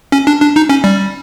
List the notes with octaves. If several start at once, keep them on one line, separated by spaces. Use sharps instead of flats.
C#4
D4
D4
D#4
C#4
G3